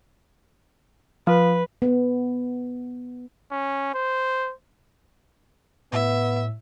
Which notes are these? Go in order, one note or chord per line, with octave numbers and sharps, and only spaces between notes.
F3 B4
B3
C#4
C5
A2 B3 E5